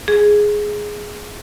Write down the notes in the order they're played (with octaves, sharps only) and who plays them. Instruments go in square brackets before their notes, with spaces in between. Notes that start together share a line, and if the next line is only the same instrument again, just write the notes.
[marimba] G#4